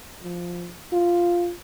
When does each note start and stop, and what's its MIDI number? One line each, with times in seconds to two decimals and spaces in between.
0.23 0.71 53
0.93 1.52 65